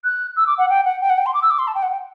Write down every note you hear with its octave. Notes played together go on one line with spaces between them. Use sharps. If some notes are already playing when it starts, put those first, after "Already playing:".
F#6
E6
D6
F#5
G5
F#5
G5
F#5
G5
C6
D6
E6
D6
C6
A5
G5
F#5
G5